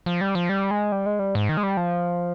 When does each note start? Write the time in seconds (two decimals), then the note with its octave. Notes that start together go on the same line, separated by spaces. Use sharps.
0.06 F3
0.21 G3
0.35 F3
0.49 G3
0.71 G#3
0.92 G3
1.06 G#3
1.19 G3
1.35 G#2
1.49 D#3
1.57 G#3
1.63 G3
1.77 F3